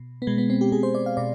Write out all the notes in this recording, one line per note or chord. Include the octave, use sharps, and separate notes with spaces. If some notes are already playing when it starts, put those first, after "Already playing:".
Already playing: B2
B3
B2 G#3
B3
C4
G4
B2 G#4
C5
D5
F5
B2 D5